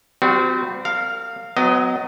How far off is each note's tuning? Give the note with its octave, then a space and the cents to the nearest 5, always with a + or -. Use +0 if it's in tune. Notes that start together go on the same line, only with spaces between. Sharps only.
G3 +0 C4 -30 F#4 -25
A#4 -35 F5 +0
F#3 +0 B3 +40 D#5 +0